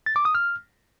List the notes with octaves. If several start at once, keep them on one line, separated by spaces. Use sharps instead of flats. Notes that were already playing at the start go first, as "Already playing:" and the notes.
A6
D6
D#6
F6